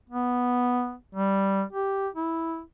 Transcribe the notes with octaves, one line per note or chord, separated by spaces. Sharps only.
B3
G3
G4
E4